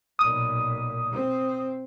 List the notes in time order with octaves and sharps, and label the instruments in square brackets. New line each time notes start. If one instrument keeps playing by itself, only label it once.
[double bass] B1 A#2 [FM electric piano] D#6
[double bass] C4